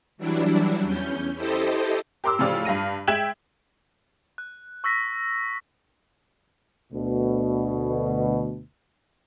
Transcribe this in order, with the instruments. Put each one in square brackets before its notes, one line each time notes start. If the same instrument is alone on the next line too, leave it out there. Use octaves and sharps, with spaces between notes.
[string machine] E3 F#3 G3 D4 E4
E2 C#4 G6
E4 G4 A4 C5 D#5
[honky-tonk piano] G4 A#4 C6 D6 E6
A2 C#3 F3 F4 G4 D5
G2 F5 A#6 D#7
G#3 E5 G5 G#6 E7 F#7
[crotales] F#6
C#6 E6 F#6 A#6 B6
[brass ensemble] D2 B2